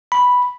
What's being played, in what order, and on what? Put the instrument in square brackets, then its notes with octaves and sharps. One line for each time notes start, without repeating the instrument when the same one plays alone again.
[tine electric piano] B5